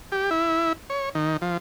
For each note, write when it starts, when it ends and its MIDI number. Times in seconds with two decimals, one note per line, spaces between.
0.12 0.30 67
0.31 0.73 64
0.90 1.09 73
1.15 1.37 51
1.42 1.57 53